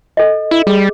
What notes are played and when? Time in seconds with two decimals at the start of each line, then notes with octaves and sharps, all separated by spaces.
0.17 A4 D#5
0.51 E4
0.67 G3 G#4